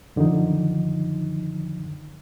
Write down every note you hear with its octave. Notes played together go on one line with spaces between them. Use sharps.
F#2 D3 D#3 F3 D#4